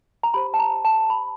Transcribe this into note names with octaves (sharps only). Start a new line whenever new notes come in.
A#5
G4 C5 B5
A5
A#5
A5
B5